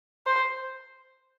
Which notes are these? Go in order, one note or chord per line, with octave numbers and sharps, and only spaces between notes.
C5